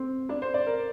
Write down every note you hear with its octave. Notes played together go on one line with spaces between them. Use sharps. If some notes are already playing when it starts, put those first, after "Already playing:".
Already playing: C4
D4
C5
D5
A#4